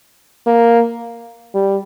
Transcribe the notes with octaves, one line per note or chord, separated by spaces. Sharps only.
A#3
G3